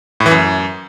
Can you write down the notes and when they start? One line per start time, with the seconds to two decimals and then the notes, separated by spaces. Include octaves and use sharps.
0.20 A2
0.26 E3
0.31 F#2